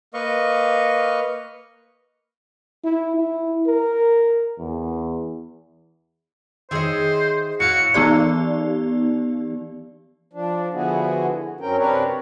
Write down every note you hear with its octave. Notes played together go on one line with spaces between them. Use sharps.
A#3 B4 D#5 F5 C#6
E4
E4
A#4
E2
D#3 G#4 C5 C#5 D#5 E5
A2 E4 F#4 F5 C#7
E3 B3 D#4 G4 D5
F3 D4
D3 F3 B3 E4 F#4 G#4
F#2 F#3 C4 C#4 A#4 G5
C3 C4 D4 A#4 B4 C#5